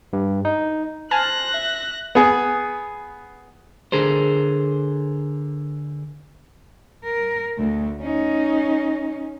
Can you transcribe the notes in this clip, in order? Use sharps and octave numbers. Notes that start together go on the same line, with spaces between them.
G2
D#4
C5 G#5 A5 F6 F#6 A#6
E5
B3 G#4
D3 G#4 A#4 C5
A#4
D2 A3
C#4 D#4